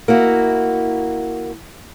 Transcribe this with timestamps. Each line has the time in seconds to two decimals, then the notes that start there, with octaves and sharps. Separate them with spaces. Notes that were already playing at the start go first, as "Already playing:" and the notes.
0.08 A#3 E4 F#4